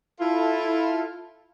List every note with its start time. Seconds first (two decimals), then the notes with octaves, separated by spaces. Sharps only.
0.20 E4 F4 A4